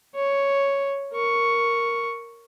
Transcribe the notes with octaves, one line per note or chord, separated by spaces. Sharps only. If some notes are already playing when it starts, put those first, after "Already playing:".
C#5
A#4 C#6